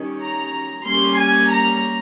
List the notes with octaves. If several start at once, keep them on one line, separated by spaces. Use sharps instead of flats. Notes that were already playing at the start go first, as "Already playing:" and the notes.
Already playing: D#3 G3 C#4
A#5
G3 A#3 C#4 C6
G#5
A#5